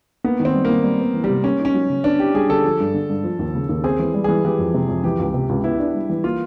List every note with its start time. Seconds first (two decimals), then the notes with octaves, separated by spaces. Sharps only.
0.24 A#3 B3
0.40 D#3
0.45 C4
0.54 G3
0.65 A#3
0.70 D#3
0.84 G3
1.00 B3
1.14 E3
1.24 G3
1.30 C3
1.44 A#3 C#4
1.60 D#4
1.65 C#4
1.74 F#3
1.90 C#3
2.04 B3 D4
2.19 E4 G4
2.34 G3 G#4
2.49 D3 A4
2.64 F3
2.80 G2
2.94 D3
3.09 G2
3.24 F3
3.39 D#2
3.55 C#3
3.69 D#2
3.84 C4 G#4
3.99 E3
4.14 G3
4.24 E3 G#4
4.45 E3 G4
4.59 F2
4.74 C3
4.89 F2
5.04 E3 G4
5.19 C#2
5.34 C3
5.49 C#2
5.64 B3 E4
5.79 D4
5.94 G3
6.10 E3
6.24 A#3 F4